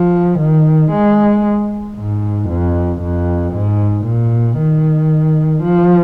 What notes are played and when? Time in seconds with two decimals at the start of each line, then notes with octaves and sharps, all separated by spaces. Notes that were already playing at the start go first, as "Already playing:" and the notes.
Already playing: F3
0.39 D#3
0.91 G#3
1.97 G#2
2.49 F2
3.02 F2
3.54 G#2
4.05 A#2
4.58 D#3
5.63 F3